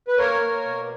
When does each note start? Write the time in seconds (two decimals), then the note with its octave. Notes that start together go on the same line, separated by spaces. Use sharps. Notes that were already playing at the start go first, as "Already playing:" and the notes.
0.08 B4
0.18 A#3 A#4 C#5
0.41 A#3
0.65 B2